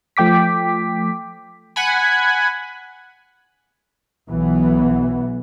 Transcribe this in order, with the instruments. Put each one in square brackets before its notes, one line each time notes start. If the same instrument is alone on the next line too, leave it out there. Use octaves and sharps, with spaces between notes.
[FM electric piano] F3 A3 G5 D6 B6
[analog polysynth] F#5 G#5 B5
[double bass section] B1 E3 B3